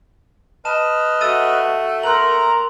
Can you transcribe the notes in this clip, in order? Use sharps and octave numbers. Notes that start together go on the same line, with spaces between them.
B4 D#5 A5 F6 E7
A3 F#4 E6 A6 D#7
A#4 A#5 C6 F#6 F#7